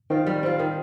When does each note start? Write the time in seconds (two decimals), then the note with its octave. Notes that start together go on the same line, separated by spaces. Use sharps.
0.10 D#3 C4 F4
0.27 G3
0.43 C4 F4
0.59 D#3